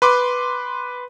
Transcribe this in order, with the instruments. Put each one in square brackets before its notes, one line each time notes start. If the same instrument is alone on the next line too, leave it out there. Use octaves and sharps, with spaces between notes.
[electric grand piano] B4 C6 D6